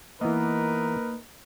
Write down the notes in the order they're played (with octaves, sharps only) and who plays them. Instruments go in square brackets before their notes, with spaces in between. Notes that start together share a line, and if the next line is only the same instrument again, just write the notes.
[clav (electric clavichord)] E3 B3 D#5 [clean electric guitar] A#3 [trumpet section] D#4 A#4 B4